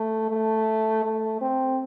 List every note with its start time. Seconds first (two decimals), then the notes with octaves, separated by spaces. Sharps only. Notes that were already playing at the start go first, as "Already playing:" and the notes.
Already playing: A3
0.30 A3
1.04 A3
1.41 C4